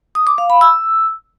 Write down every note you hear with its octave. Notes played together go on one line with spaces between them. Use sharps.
D#6
D6
F5
B5
E6